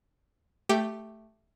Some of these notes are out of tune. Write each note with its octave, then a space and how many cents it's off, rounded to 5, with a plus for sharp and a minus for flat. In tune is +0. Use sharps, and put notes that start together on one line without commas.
A3 +0 G4 +0